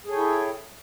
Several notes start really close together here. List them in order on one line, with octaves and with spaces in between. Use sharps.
G#4 A4 C#5 G5 E4